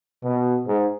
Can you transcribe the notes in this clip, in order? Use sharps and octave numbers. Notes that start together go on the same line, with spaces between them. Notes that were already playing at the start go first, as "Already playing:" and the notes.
B2
G#2